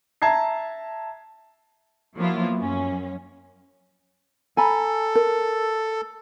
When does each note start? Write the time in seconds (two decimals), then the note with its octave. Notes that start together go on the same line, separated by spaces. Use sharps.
0.22 E5 A5 A#5 G#6 C7
2.16 F3 F#3 A#3 B3 E4 F4
2.59 F#2 C#4
4.57 A4 G#5 A#5 B5
5.15 A#4